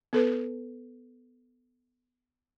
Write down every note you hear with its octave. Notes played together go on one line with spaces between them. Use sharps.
B3 A4 B4